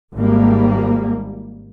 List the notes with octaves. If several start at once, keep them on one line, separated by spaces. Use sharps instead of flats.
G#1 G3 A#3